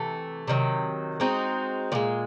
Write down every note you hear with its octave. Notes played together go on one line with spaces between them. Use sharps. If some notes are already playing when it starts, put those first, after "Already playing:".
Already playing: C3 E3 A3
C3 D#3 F#3
G#3 C4 D#4 F#4
A#2 F3 G#3